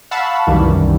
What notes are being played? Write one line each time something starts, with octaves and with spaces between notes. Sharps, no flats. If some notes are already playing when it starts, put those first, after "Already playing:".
F5 F#5 A5 B5 C#6 E6
C2 F#2 D#3 E3 G3